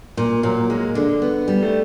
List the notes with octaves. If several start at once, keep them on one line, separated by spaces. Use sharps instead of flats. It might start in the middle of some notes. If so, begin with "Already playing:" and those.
A#2
A#2 F#3
G#3 A#3
D3
B3
G3
A3